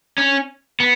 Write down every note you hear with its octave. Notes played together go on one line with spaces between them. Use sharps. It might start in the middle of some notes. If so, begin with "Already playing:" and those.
C#4
B3